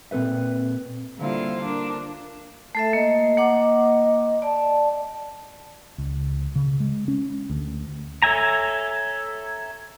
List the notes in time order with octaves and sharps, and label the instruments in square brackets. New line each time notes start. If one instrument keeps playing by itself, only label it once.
[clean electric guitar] A#2 C4 A4 B4 E5
[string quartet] D3 G3 A#3 E4 F4 C5
D4 A#4
[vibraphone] A3 A4 E5
[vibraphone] A#3 [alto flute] D#5
[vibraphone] A#3 F#5 D6
[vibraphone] D5 [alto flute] A5
[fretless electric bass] C#2
C#3
G#3
C#4
D2
[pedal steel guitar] A4 C#5 E5 G#5 A#5